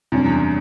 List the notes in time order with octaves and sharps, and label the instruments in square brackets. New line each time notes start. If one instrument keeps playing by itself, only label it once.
[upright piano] F#2 [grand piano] C3 G3 D4
[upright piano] E2